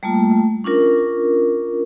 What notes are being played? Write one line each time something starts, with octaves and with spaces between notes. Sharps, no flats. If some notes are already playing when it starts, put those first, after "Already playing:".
G3 A3 A#3 F4
C#4 D4 F4 A#4